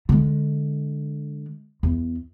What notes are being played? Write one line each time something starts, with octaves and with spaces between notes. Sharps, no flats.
D3 G#3
E2